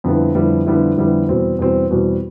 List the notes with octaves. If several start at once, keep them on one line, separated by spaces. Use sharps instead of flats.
F2 D3 G3 B3 E4
F2 D3 G3 B3 E4
F2 D3 G3 B3 E4
F2 D3 G3 B3 E4
E2 B2 G3 C4
E2 B2 G3 C4
E2 B2 G3 C4